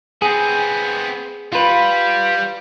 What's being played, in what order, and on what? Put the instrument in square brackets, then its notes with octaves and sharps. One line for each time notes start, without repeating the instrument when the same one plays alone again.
[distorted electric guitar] B3 C4 [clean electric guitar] G#4
[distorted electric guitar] G3 [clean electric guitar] F4 B4